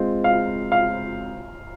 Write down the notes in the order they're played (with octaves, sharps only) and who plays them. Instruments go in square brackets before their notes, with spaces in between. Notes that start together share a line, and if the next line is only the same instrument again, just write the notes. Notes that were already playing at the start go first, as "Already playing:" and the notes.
Already playing: [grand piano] G#3 C4 F4
[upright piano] F5
F5